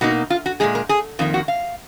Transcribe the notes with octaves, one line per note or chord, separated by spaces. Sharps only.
B2 A#3 D#4 F#4
F4
F#4
A#2 F3 G#3 G#4
A#4
G#4
F2 D#3 A#3 F4
F#4
F5